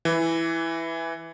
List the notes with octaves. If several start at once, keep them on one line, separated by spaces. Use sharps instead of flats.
E3